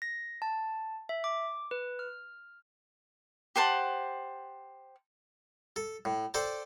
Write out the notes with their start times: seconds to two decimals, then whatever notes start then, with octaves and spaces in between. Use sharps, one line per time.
0.02 A#6
0.42 A5
1.09 E5
1.24 D6
1.71 B4
1.99 F6
3.56 G4 C5 F#5 A5
5.76 A4
6.05 A2
6.34 A4 C5 D5 G5 A5